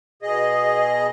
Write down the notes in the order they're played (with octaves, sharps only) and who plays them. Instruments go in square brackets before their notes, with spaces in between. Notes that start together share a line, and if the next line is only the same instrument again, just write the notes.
[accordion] B2 G#4 D#5